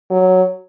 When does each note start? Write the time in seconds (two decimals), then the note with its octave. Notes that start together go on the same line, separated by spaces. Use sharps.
0.11 F#3